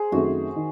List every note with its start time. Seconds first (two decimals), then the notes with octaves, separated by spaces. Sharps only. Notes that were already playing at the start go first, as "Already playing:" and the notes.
Already playing: G#4 C5
0.12 F#2 D#3 A3 C4 F#4
0.56 D#3